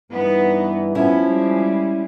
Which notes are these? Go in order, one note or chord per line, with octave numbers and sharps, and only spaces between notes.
G2 E3 B3 D#4
F3 B3 C#4 E4
G3 G#3